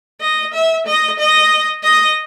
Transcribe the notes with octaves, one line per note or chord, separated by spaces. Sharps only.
D#5
E5
D#5
D#5
D#5